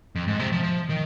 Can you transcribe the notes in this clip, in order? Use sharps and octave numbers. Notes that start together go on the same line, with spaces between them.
F2
G#2
C3
F3
D#3